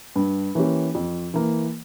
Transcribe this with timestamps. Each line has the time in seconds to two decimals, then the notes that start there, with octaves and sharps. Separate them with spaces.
0.16 G2
0.55 E3 A#3 C#4 G4
0.95 F2
1.34 E3 A#3